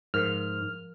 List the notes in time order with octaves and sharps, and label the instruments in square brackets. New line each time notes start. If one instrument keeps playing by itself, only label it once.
[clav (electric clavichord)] G#2 [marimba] F3 A#4 [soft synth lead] F6